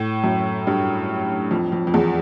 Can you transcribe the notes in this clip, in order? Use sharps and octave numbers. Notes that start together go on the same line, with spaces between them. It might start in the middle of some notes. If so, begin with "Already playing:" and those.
Already playing: A2
F#2
G2
F2
F2
F2
E2